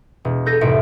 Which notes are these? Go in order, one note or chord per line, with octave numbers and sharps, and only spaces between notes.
E1
A4 G6 A#6 D#7
F1 C2 A2 E5 C#7 D7